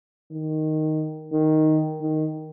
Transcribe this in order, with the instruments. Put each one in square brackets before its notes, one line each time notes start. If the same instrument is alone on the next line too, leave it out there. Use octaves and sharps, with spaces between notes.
[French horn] D#3
D#3
D#3